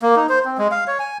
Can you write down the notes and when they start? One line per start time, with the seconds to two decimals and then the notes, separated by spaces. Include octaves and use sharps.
0.02 A#3
0.16 D#4
0.29 C5
0.45 C4
0.58 G#3
0.71 F5
0.87 C#5
1.00 G#5